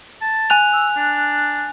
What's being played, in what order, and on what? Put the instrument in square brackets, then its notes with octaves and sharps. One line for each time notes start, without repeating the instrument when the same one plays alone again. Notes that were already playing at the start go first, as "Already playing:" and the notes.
[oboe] A5
[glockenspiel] G#5 F#6 F7
[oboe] E6
D4